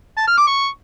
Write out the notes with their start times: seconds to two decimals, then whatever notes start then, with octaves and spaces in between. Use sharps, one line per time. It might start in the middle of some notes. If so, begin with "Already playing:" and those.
0.18 A5
0.28 F6
0.38 D6
0.47 C#6